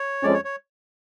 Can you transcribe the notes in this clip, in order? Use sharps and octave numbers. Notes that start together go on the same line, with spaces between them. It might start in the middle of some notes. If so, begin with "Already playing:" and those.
Already playing: C#5
F2 F3 G#3 C#4 D5
C#5
C#5